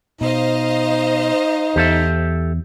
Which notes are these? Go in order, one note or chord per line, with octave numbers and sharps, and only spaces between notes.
B2 D#4 C5 D#5 F5
E2 G4 A4 E5